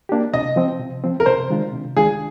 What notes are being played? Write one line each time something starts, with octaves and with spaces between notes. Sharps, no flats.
A#3 D4 G4
C3 D#5
F3 C4
C3
F3 C4
A#4
C3 C5
D#3 G#3 D4 F4
C3
D#3 G#3 D4 F4 G#4